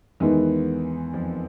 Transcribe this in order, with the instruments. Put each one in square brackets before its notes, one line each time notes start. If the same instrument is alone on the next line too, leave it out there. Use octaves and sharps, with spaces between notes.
[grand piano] E2 E3 [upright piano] D#3 G#3 B3 D#4
[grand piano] F2 F3